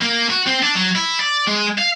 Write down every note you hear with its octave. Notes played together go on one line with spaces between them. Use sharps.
A#3
F#4
C4
D4
F#3
E4
D5
G#3
F5